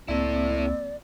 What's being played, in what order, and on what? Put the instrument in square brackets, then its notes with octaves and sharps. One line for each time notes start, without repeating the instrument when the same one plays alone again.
[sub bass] C#2 [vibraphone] A#3 C4 E6 [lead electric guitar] E4 A4 [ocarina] D5